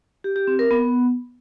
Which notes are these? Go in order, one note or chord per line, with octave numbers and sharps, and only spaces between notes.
G4
G4
C4
A#4
B3